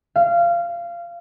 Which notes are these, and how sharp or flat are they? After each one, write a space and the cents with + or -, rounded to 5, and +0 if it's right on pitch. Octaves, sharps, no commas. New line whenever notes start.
F5 -20